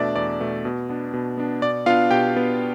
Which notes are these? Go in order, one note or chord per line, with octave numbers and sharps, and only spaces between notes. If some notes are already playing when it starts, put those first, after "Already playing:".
Already playing: E2 B2 A3 D4 D5 E5
E2 D5
B2 A3 D4
B2
B3 D4
B2
B3 D4
B2 D5
B3 D4 F4 F5
B2 G4 G5
B3 D4